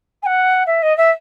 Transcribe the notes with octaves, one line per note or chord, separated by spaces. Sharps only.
G#5
F#5
E5
D#5
E5